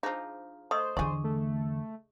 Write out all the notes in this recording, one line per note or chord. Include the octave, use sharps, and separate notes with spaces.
F3 D4 D#4 G#4 C5
A3 C5 D#5 C6 D#6
E2 D3 G#4 D5 G#5 C#6
A3